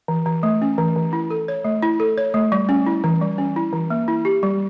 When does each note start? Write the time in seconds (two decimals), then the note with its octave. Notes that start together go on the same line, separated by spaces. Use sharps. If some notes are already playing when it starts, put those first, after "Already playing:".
0.08 E3
0.26 E3
0.43 A3
0.62 C#4
0.78 E3
0.96 E3
1.13 E4
1.30 A4
1.48 C#5
1.65 A3
1.83 E4
2.00 A4
2.18 C#5
2.34 A3
2.52 G3
2.69 C#4
2.86 E4
3.04 E3
3.21 G3
3.38 C#4
3.56 E4
3.73 E3
3.90 A#3
4.08 E4
4.25 G4
4.43 G3